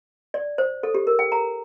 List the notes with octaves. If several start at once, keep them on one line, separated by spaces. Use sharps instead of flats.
D5
C5
A4
G4
A#4
G5
A#5